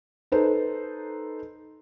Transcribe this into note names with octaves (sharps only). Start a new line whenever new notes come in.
D#4 A4 B4 C5